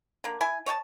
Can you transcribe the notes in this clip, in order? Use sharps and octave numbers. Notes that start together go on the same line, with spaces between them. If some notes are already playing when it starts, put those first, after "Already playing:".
D3 A#3
E4 G#5
C#5 D#5 G5 A5